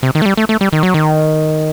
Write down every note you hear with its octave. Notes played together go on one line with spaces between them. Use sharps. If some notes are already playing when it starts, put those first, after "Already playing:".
C3
D#3
A3
G3
A3
A3
G3
D#3
F#3
D#3